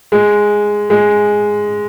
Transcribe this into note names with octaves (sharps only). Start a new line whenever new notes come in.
G#3
G#3